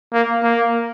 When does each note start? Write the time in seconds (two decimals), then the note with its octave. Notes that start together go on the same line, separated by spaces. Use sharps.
0.13 A#3
0.43 A#3